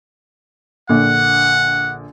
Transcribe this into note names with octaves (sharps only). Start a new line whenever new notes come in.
A#1 D3 F#5